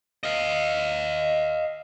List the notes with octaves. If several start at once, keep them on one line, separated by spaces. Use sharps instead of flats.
D#5 F5